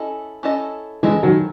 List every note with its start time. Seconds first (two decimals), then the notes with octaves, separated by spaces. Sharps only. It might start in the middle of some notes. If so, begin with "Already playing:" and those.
Already playing: C#4 E4 A4 D#5
0.43 C#4 E4 A4 D#5
1.03 E3 G#3 C#4 E4 A4 D#5
1.23 D#3 F#3